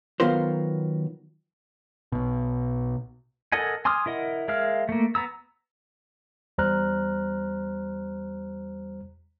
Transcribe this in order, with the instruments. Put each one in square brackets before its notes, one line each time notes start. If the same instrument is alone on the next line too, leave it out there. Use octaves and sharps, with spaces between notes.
[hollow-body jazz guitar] D#3 F#3 B3 F4 A#4 C5
[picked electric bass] B1 B2
[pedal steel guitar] A4 A#4 D#5 F#5 G#5
G#5 C6 D6 D#6 F6
E4 A#4 D#5 F#5
G#3 A#4 E5 F5 F6
A3 A#3
B3 A#5 E6
[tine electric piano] E2 G3 C5 A#5 F6 F#6